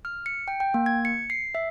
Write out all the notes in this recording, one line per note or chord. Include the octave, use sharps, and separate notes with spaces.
F6
C#7
G5
G5
A#3
G#6
C#7
C7
E5